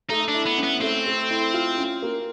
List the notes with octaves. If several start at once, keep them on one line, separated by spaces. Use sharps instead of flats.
A3 D#4
D4
E4
B3
C#4
B3
A3 C4
A3
E4
F4
C#4
A#3